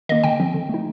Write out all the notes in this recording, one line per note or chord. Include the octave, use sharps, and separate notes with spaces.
D#3 A#3 D#5
D3 G5
F3 C4
D3
A3 D#4